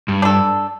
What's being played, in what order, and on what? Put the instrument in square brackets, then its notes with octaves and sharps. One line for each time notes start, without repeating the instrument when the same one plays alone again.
[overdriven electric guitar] G2
[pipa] D4 A4